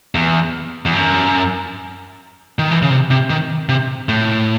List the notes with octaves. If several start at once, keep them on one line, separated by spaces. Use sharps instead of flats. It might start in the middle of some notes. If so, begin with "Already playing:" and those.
E2
E2
F#2
D#3
E3
C#3
C3
C3
D#3
C3
A2